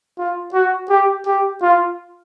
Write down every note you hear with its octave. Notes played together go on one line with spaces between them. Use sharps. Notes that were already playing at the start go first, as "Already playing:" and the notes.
F4
F#4
G4
G4
F4